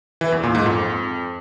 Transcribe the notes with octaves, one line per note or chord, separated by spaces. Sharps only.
E3
E2
A#2
G#2
F2